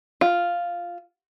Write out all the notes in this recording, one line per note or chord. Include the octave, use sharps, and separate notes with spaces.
F4